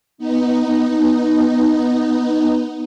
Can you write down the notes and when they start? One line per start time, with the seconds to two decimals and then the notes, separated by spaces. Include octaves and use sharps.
0.18 B3 D#4